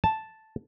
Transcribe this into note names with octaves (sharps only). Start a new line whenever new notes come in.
A5